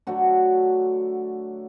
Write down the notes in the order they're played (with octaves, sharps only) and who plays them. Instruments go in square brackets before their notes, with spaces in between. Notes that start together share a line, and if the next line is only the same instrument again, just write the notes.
[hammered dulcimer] D3 F#3 A3 D4 F#4